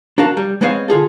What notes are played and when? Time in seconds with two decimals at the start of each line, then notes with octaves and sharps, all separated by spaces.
0.18 D4 F#4 A#4 F5 A5
0.37 G3
0.61 G#3 B3 C4 C#5 D#5 F5
0.88 D3 F4 G#4 A4